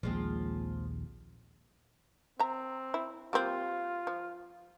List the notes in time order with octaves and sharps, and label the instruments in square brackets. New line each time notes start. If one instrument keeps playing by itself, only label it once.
[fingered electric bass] A#1 D#2 [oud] F3 G#3 C4
[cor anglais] C4 [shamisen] E5 A#5
[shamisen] E4
[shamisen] G3 A#3 C4 [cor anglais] F4
[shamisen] F3